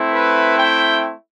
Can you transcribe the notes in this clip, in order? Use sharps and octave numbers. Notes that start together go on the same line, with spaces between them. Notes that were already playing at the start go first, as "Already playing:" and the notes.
Already playing: A3 C4 E4
B4
G5